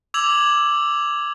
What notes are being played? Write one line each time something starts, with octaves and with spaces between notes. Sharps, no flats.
D6 E6 G#6 F7 F#7